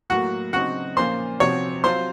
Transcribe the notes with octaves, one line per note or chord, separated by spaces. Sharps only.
A2 F#3 A#3 F#4 F#5
C#3 F#3 C4 D#4 F#4 F#5
A#2 F3 A#3 C#4 F4 C5 C6
C3 F3 C4 F#4 C#5 C#6
F#3 C4 F4 C5 C6